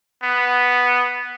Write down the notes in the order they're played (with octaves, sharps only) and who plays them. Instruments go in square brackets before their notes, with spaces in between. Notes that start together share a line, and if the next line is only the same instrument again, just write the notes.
[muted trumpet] B3